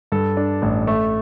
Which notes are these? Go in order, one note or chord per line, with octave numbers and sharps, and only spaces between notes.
G2 A4
D4
A1
A3